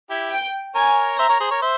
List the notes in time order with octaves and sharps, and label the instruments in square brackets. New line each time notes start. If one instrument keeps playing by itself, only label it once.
[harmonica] E4 G4
[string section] G5
[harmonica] A#4 C#5 [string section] G#5
[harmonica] C5 E5 [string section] A#5
[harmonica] A#4 C#5
G#4 C5
A#4 C#5
C5 E5